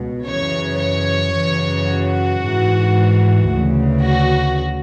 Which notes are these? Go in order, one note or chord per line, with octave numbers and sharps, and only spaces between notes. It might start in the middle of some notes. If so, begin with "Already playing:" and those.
Already playing: C#2 B2
F#2 C#3 E3 C#5
C#5
F#2 C#3 E3
F#4
G#2 E3
D2 C#3 E3
F#4